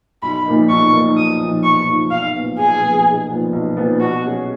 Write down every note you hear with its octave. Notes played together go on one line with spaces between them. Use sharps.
B1 B5
A#2 F3 A#3 D#4
B1 C#6
A#2 F3 A#3 D#4
B1 D#6
A#2 F3 A#3 D#4
B1 C#6
A#2 F3 A#3 D#4
B1 F5
A#2 F3 B3
B1 G#4
A#2 F3 B3
B1
A#2 F3 B3
B1
A#2 F3 B3
B2 F#4
F#3 C#4 G#4